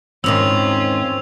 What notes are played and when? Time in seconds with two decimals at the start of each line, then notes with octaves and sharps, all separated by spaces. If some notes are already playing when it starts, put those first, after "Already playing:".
0.24 E2 G#2 D#3 C4 C#4 F4 E6 F7